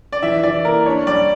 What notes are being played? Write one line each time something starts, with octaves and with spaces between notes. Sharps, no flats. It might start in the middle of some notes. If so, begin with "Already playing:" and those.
D5
E3 E5
E3 D5
A#3 A#4
D4 C#5
G3 D5